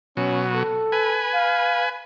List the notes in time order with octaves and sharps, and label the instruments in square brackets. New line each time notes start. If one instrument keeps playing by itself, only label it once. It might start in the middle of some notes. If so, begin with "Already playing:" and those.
[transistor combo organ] B2 F#3 [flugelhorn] C#4
[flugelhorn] A4
[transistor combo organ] B4 G#5
[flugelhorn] F5